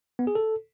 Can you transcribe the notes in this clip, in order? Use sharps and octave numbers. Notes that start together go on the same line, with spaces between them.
B3
G#4
A4